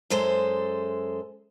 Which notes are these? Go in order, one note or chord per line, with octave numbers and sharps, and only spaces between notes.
F#2 G#3 A4 C5